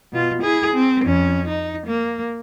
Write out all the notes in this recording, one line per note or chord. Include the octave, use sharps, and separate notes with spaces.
B2 F4
E4 G#4
C4
F2 C#4
D#4
A#3